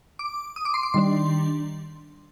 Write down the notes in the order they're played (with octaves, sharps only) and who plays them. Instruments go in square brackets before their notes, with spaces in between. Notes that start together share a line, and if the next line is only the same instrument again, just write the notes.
[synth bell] D6
D#6
D6
C6
D6
D#3 G3 D4 C6